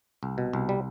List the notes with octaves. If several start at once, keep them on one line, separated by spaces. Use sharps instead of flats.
C2
B2
C2
G3